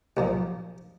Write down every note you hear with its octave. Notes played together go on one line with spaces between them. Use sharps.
B1 A#2 F3